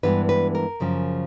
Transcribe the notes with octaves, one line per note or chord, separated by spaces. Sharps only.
G2 E3 G#3 B3 D4 B4
B4
A#4
F#2 C#3 F3